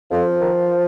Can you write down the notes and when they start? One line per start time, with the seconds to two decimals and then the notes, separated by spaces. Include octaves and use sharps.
0.10 F2 F3
0.41 D#3